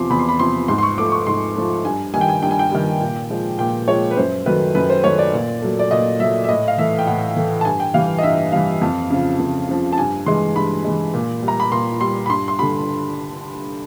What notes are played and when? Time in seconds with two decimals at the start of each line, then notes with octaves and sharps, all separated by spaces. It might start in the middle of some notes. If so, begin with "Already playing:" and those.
Already playing: E2 C3 F3 C6 D6
0.10 E2 B5
0.19 C6
0.29 B5
0.39 C3 F3 C6
0.68 G#2 C6
0.78 C6
0.83 C#6
0.98 F3 A3 D6
1.12 C#6
1.26 G#2 C6
1.56 F3 A3
1.85 G2 G#5
2.13 D#3 G3 G#5
2.21 G5
2.28 G#5
2.42 G2 G5
2.51 G#5
2.59 G5
2.72 D#3 G3
3.01 A#2
3.30 F3 G#3
3.58 A#2 G5
3.88 F3 G#3 C#5
4.11 B4
4.17 F#2 C5
4.46 D#3 F#3 A3 B4
4.75 F#2 B4
4.90 C5
5.04 D#3 F#3 A3 C#5
5.19 D5
5.33 A#2
5.62 F#3 A3
5.79 D5
5.91 A#2 D#5
6.20 F#3 A3 E5
6.44 E5
6.49 A2 D#5
6.68 F5
6.78 E3 A3 E5
6.99 G5
7.07 A2 F#5
7.36 E3 A3
7.61 A5
7.65 G2 G#5
7.80 G5
7.94 E3 G3 F5
8.18 D#5
8.23 G2 E5
8.52 E3 G3 F5
8.82 F2
9.10 C#3 F3
9.39 F2
9.69 C#3 F3
9.92 A5
9.98 G2 G#5
10.26 E3 G#3 C6
10.56 G2 B5
10.84 E3 G#3
11.14 A#2
11.43 G3
11.48 A#5
11.60 B5
11.72 A#2 C6
12.01 G3 C6
12.26 B5
12.29 G2 C6
12.48 C6
12.59 D3 G3 B5